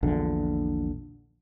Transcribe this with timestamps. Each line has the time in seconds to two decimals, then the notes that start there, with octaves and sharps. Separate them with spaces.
0.03 A#1 E2 D3